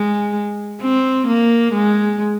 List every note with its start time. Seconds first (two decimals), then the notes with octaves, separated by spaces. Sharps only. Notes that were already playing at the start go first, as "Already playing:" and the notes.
Already playing: G#3
0.81 C4
1.27 A#3
1.73 G#3